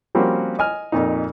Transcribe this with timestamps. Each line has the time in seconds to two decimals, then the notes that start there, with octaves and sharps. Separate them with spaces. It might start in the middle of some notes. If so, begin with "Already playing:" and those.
0.15 F3 G3 A#3 C4 C#4 F#4
0.59 D#5 G#5 F6
0.92 F2 A#2 D#4